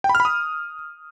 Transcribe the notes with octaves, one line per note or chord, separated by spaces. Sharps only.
G5
B5
F6
B5
D#6